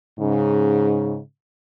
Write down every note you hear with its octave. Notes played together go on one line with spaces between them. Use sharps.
G#2 C#3